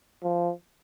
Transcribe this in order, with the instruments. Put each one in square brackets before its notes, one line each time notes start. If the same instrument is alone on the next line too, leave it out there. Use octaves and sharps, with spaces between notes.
[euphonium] F3